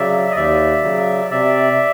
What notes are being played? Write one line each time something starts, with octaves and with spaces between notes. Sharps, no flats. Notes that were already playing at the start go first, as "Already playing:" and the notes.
Already playing: C#3 F#3 D5 E5
D#5
D#2 D5 E5
C#3 F#3
C3 D5 E5